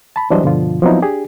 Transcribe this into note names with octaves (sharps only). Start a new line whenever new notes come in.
A5 B5
E3 F#3 G3 D4 C5 D#5
G2 B2 D3 F3 F4
F3 F#3 B3 C4 D#4 E4
D4 G4 G#4